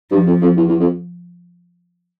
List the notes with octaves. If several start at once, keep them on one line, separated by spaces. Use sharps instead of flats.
G2 F3
F2
F2
E2
E2
F2